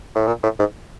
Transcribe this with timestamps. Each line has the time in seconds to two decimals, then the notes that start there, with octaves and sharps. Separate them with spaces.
0.15 A2
0.27 A#2
0.43 A2
0.59 G#2